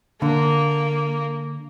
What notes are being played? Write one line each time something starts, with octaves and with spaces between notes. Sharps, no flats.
D3 A#3